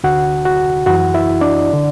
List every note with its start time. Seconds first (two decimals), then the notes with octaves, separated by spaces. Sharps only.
0.04 D2 D3 F#4 F#5
0.45 F#4 F#5
0.86 F#2 E3 F#4 F#5
1.14 E4 E5
1.41 D4 D5
1.73 D3